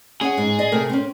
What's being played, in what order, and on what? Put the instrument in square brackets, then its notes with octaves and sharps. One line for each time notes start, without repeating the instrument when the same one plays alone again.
[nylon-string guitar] C#4 F#5 [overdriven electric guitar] G#4
[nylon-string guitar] G#2
D5 D#5
C3 A3 A#4
C4 C#4